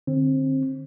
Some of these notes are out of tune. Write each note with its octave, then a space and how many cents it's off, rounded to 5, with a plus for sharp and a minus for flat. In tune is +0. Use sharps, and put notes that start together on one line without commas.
D3 +30 C4 +25